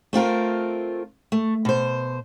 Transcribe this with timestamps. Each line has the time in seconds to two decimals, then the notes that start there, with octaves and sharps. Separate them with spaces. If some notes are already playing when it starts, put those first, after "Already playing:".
0.13 A3 C4 F4 A#4
1.32 A3
1.65 B2 C5